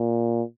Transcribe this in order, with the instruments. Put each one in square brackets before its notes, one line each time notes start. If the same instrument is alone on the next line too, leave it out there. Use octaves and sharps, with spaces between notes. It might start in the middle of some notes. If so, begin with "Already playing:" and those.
Already playing: [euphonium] A#2